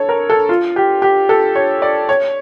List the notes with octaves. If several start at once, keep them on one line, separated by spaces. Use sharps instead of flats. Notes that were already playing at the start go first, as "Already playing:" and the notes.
Already playing: A4 C#5
A#4
A4
F4
G4
G4
A4
C#5
D5
C#5